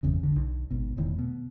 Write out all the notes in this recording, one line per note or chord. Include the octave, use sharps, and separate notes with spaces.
G1 E2 C#3
G#1 D3
B1
G#1 B2
E1 A2 D#3
B2